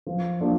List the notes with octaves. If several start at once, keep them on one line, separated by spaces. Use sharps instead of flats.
F3
A#3 D4 F4